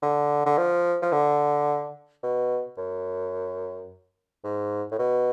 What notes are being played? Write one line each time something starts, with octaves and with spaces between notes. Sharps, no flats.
D3
D3
F3
F3
D3
B2
F#2
G#2
A2
B2